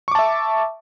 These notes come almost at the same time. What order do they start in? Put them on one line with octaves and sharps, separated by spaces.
C#6 D6 A5 E5